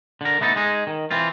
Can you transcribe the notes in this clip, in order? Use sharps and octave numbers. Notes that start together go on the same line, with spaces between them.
D3 A#4
A3 B3 D#4 E4 A4
G#3 D#4 G#4
D#3
E3 C4 F4